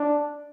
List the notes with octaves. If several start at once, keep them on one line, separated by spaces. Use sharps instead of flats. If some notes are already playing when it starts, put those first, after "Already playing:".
Already playing: D4